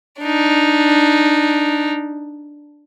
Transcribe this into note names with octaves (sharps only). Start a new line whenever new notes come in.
D4 D#4